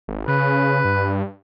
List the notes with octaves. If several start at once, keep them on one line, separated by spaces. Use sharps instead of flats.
G#1
C#3 B4
G2